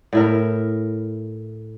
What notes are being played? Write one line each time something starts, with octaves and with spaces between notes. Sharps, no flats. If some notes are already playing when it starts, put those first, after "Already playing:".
A2 E4 A#4